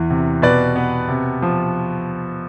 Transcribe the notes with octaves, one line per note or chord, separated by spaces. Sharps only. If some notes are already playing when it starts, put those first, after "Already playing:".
Already playing: E2 E3
C3
B2 B4 D5
B3
C3
F3